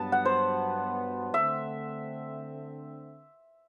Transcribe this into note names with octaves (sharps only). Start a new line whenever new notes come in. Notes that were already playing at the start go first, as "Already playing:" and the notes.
Already playing: G2 F#3 B3 A5
F#5
C5
D3 A3 C4 E5